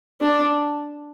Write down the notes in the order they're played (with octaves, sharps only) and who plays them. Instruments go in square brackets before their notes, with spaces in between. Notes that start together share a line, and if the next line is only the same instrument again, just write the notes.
[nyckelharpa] D4